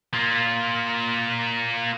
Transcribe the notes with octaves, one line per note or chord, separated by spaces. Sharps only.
A#3 F4